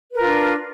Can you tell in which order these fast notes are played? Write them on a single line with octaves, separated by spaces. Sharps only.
B4 A#4 F4 D4